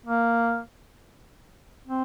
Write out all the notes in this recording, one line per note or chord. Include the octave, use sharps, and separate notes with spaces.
A#3
C4